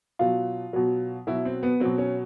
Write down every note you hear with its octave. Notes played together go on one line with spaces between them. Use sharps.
B2 F#3 F4
B2 F#3
B2 F#3 E4
C4
B3
B2 F#3 C4
C#4